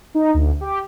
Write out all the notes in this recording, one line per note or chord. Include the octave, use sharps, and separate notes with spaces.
D#4
D2
G4